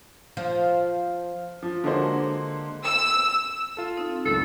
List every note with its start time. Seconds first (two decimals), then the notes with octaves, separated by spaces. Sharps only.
0.37 F3
1.63 F3
1.84 D3 G#3 A#3 F#4 C5
2.85 E6
3.77 F4 A4
3.97 C4 D4 D#4
4.25 C#2 F#2 A2 A4